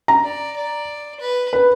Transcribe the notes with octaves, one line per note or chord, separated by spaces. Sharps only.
A#5
D5
D5
B4
B4